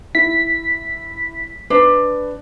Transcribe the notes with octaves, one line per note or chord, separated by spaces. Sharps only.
E4 B6
D4 B4